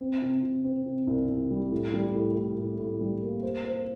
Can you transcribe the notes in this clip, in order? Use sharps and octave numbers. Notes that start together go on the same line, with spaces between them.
C4
C3
C3
C4
C3
C2
C2
G3
A2
G3
A2
A2
A2
A2
G3
A#3
C5
C5